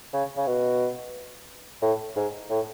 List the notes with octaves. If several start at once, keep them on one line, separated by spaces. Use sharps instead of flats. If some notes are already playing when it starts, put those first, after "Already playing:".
C#3
C#3
B2
A2
G#2
A2